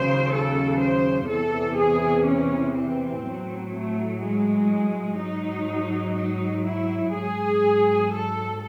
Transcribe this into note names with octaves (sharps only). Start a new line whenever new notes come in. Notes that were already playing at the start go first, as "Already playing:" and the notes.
Already playing: D#2 C#3 F#3 C5
A4
C5
E2 C3 E3 A4
G#4
C#4
C4
A2 F#3
A3
G#3
G#2 F#3 D#4
D#4
E4
G#2 F#3 G#4
A4